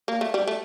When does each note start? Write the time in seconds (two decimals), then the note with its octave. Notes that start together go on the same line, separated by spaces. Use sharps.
0.08 A#3
0.21 A3
0.34 G3
0.48 A3